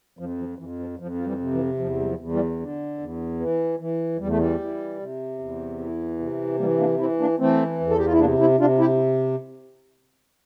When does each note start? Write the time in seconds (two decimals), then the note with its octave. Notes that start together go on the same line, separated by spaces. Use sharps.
0.19 F2 F3
0.39 F3
0.59 F2 E3
0.79 F3
0.99 F2 F3
1.14 F3
1.25 E3 G3
1.40 C3
1.53 E3
1.79 E2 F3
2.00 G3
2.06 F3
2.19 E2
2.32 E3 G3
2.60 D3
2.99 E2
3.40 E3
3.79 E3
4.19 E2 G3
4.29 A3
4.37 E3 G3
4.60 E3
4.99 C3
5.39 E2
5.79 E3
6.19 C3
6.59 E3 G3 A#3
6.79 A#3 D4
6.99 E3 C4 E4
7.20 A#3 D4
7.39 E3 A3 C4
7.80 E2
7.90 A4
7.98 G4
8.06 F4
8.12 E4
8.19 C3 A#3 D4
8.39 C4 E4
8.60 C3 D4 F4
8.79 E4 G4